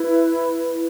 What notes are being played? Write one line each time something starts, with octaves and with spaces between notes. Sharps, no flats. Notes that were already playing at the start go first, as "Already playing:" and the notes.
Already playing: E4 B4